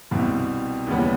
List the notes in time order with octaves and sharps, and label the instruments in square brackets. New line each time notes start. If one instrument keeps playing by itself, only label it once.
[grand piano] C2 B2 G3 C4
D#2 C#3 E3 G3 B3